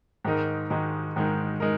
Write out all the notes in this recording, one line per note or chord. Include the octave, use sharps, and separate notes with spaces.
G#2 D#3 G#3 D#4 A#4
G#2 D#3 G#3 D#4 A#4
G#2 D#3 G#3 D#4 A#4
G#3 D#4 A#4